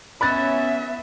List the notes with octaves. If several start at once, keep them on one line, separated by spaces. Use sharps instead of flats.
B3 C#4 E5 B5 F#6 A6